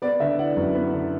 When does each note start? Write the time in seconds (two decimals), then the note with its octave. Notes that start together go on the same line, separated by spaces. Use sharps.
0.02 B3 D5
0.20 D3 B4 E5
0.38 E4 D5 F#5
0.56 F#2 B4
0.74 B3
0.93 D3